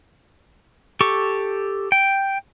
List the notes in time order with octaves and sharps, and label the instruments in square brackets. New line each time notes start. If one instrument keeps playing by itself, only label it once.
[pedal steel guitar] G4 A4 C#6
G5